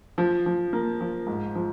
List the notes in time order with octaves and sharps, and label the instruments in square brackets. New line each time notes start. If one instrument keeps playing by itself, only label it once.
[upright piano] F3
F3
A#3
F3
G#2
F3